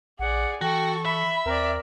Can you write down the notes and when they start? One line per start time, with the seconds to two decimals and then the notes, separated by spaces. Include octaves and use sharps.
0.19 A#1 G#4 D5 F#5
0.61 E3 F#4 A4 G5 C#6
1.05 E5 B5
1.46 D#2 C4 A#4 D5